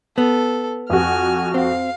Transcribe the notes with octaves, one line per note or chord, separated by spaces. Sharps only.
B3 A4
F2 F#4 G#5 F6
C4 F5